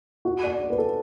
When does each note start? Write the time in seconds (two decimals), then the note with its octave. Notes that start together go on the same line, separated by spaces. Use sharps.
0.25 F#4
0.43 D5
0.61 D5
0.70 B4
0.78 A4